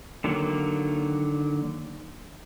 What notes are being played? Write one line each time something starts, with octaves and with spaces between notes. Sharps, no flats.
D3 D#3 F#3 A#3